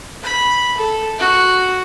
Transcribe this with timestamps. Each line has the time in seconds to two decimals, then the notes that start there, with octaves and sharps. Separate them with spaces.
0.23 B5
0.78 A4
1.18 F#4